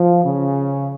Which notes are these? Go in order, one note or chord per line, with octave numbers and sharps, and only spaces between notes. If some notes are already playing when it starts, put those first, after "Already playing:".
Already playing: F3
C#3